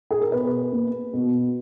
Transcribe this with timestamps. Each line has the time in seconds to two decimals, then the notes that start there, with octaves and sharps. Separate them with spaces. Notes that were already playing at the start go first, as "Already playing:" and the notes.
0.11 G#4
0.21 A#4
0.32 B2 B4
0.72 A#3
1.13 B2